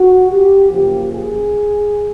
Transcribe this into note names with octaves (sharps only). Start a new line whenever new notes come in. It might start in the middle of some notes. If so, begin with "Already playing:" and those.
Already playing: F#4
G4
F#2 C#3 F3 A#3 G4
G#4